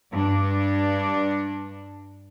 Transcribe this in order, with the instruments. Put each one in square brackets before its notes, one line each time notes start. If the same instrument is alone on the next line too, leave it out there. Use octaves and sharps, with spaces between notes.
[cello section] G2 D4